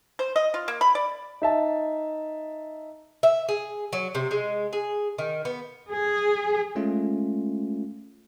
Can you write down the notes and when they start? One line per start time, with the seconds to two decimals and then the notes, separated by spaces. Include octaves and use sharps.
0.19 C5
0.36 D#5
0.54 F4
0.68 A#3
0.81 B5
0.95 D5
1.42 D#4 E5 A5
3.23 E5
3.49 G#4
3.93 F#3
4.15 C3
4.31 G#3
4.73 G#4
5.18 D#3
5.45 B3
5.91 G#4
6.75 G#3 A3 C#4 F4